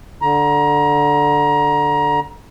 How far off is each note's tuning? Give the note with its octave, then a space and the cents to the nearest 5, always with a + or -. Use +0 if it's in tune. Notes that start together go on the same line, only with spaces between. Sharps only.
D3 -5 A#5 +25